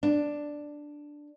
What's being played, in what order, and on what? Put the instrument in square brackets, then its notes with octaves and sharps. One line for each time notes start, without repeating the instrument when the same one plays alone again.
[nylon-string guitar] D4